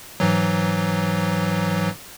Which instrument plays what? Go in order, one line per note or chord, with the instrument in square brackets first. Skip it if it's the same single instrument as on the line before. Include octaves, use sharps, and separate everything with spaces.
[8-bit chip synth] G#2 E3 F#3